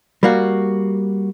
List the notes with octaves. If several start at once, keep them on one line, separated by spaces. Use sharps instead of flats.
G3 A#3 F#4